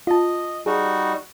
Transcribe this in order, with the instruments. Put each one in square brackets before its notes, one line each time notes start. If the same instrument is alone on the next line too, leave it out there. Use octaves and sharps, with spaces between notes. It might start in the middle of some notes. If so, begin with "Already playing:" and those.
[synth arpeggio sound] F4 A5 [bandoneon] D#5
[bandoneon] G3 D#4 F#4 [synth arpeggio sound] G#4